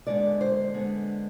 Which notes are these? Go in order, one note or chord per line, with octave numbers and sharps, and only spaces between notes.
D3 G#3 B3 D5
C5
D3 G#3 B3